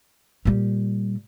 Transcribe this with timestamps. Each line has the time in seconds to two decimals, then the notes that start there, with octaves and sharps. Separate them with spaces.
0.45 A#2 G3